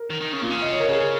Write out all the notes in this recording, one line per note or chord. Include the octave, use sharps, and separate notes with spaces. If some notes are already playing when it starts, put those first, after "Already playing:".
Already playing: A#4
D#3
D#3
C#3
A#2 F4
C#3
D#5
C#5
A#4
C#3 G#4